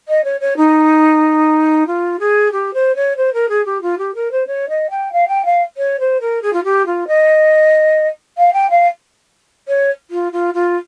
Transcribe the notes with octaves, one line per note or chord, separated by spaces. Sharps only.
D#5
C#5
C#5
D#4
F4
G#4
G4
C5
C#5
C5
A#4
G#4
G4
F4
G4
A#4
C5
C#5
D#5
G5
F5
G5
F5
C#5
C5
A#4
G#4
F4
G4
F4
D#5
F5
G5
F5
C#5
F4
F4
F4